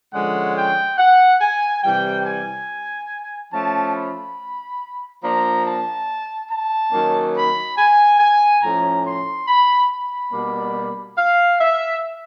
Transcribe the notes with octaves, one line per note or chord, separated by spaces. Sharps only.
D3 F3 G#3 C#4 F#5
G5
F#5
G#5
C3 E3 G3 G5
G#5
F3 A3 C#4 A5
B5
F3 A#3 D4 A#5
A5
A5
D#3 F#3 A#3 C#4
B5
G#5
G#5
A2 F3 A3 C#4 A#5
C6
B5
B5
B2 G3 A#3 D4
F5
E5